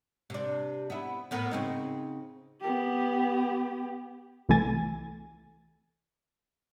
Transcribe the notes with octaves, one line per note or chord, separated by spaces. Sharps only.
C3 D4
B3 E4
A2 B3 A#4
C#3 C4 D#4
B3 G4
C2 E3 A3 G#5 A6